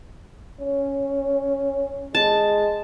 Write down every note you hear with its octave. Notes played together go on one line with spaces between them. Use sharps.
C#4
G#3 A5